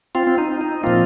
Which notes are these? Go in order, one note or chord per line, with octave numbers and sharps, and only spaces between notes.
C4 F4
C4
D#4
D#4
A#2 F3 A#3 C4 F4